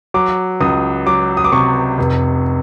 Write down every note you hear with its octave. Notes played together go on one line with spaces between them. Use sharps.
F#3 D6
C#2 D#6
F#3 D6
D#6
D6
C3 C#6
F1